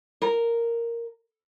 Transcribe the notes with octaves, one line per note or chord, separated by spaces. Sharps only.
A#4